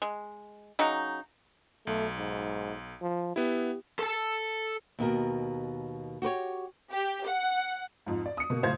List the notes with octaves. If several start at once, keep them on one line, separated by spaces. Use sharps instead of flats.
G#3
C#3 F#3 D#4
B1 A3
G#2
F3
B3 E4 G4
A4 A5
D#2 B2 A#4
F#4 G4 B4 C#5
G4
F#5
F2 G#2
D5
D#6 C#7
B2 A#3
F#1 A2 C5 F5 G#6